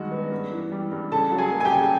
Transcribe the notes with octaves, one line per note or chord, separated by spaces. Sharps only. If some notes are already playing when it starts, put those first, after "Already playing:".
Already playing: G2 D#3 G#3 F#4
B3
G2
E3
G3
G2
C#3 A4 A5
F#3
G#4 G#5
A#3
G#5
G4 G5
C#3